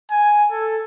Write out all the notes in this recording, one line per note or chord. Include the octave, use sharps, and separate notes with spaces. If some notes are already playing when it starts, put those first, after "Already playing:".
G#5
A4